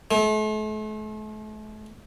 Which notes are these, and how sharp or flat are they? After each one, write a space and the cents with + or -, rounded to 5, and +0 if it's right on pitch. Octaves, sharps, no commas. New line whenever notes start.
A3 -40